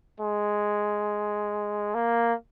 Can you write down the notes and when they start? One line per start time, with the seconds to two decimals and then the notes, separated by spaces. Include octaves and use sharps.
0.20 G#3
1.95 A#3